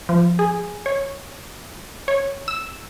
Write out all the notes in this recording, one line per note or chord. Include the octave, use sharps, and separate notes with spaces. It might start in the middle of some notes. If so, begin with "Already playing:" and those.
F3
G#4
C#5
C#5
E6